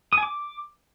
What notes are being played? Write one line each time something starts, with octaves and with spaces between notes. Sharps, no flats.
D#6
G#5
D6